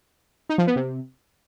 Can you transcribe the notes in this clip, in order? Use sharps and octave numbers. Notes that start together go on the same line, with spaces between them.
D#4
F3
B3
C3